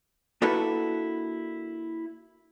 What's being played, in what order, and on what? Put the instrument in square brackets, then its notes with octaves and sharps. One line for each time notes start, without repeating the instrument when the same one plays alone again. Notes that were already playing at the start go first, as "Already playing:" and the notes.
[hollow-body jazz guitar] A#3 D4 E4 F#4 A4 B4